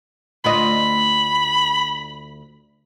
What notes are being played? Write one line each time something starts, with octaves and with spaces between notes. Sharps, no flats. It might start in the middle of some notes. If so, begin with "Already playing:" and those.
D2 F4 D#5 B5